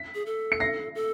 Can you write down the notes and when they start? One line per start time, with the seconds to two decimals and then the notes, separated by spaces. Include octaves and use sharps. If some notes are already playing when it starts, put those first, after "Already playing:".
Already playing: B6
0.14 G#4
0.26 A4
0.52 C#7
0.60 A#6 C7
0.95 A4